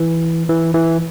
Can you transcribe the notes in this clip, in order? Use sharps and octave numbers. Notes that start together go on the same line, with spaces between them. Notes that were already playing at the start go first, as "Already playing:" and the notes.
Already playing: E3
E3
E3